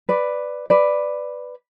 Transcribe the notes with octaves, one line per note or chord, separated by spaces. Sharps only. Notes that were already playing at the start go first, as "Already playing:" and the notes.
B4 D5
B4 D5